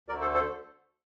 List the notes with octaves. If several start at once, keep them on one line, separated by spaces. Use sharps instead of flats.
D2 D3 A3 A#4 D5
A4 C5
A4 C5